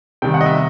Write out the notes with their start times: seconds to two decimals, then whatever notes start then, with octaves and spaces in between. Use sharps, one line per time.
0.22 C3 D#3 G3 G5
0.34 F#5
0.41 D#5
0.46 E5